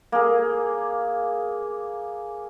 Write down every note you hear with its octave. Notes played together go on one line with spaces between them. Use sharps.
A#3 G#4